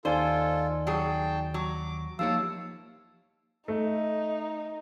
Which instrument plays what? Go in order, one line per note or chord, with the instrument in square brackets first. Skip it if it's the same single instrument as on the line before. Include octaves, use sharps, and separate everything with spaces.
[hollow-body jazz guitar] D#2 [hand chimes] D#4 D5 G#5 [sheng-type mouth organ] F4 A4 [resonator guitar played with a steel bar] C5
[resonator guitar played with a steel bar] F#3 G#4 [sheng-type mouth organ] G5 A5
[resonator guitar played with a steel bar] F#3 [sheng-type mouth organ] D6
[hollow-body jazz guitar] F3 G4 C#5 [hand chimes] A#3 D#4 E6 [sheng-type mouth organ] F5 A5
[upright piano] A3 [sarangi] D#4